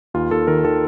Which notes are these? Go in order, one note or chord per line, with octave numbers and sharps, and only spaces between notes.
D#2 F4
D#2 A4
D#3 A#4
D#3 A4